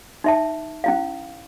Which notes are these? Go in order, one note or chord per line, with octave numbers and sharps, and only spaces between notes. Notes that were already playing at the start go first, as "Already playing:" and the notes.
D#4 E5 A5
C#4 E4 F5